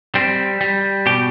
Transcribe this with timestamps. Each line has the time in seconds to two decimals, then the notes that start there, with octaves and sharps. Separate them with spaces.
0.15 G3 C4
0.61 G3
1.06 B2 G4